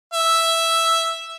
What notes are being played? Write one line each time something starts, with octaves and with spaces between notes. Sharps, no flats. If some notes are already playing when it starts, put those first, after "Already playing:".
E5